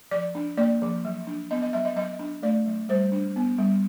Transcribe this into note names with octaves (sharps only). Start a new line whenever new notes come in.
F3 D5
D4
A#3 D5
F3
F#3
D4
B3 D#5
D#5
F#3 E5
D#5
F#3 D#5
D4
A3 D5
F#3
G3 C5
D4
B3
G3